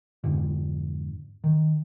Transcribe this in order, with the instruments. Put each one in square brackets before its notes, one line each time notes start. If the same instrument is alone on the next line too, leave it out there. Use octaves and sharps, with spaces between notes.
[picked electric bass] F2 G#2 D3
D#3